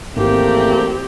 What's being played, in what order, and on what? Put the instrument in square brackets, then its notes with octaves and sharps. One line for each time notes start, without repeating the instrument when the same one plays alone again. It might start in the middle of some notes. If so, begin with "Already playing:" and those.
[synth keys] G#1 [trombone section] E2 A3 A#3 [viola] C4 G4